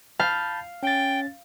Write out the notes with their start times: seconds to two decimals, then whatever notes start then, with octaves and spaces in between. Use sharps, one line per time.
0.20 F5 A5 B5 G6
0.83 C#4 G5 A6